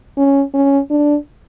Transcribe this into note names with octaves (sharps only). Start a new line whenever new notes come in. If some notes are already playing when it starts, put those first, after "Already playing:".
C#4
C#4
D4